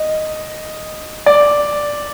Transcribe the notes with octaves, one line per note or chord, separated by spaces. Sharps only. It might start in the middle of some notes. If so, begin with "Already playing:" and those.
Already playing: D#5
D5